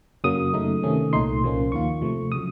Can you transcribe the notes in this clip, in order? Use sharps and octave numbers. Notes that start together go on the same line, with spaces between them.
F#2 C#3 F#3 A#3 D#6
F#2 C#3 A3 D#4
C3 D#3 A3 C#4
C2 A#2 A3 D#4 C6
C2 A#2 F3 A#3 C#4
D#2 D#3 A#3 F4 C#6
C3 F3 A3
C#3 F#3 D#6